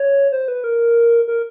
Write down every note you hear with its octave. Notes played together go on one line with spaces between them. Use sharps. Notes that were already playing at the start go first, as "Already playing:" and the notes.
Already playing: C#5
C5
B4
A#4
A#4